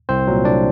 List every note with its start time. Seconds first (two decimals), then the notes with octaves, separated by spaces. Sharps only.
0.09 C2 C4 C5
0.27 A#2 F#3
0.45 C2 D4 D5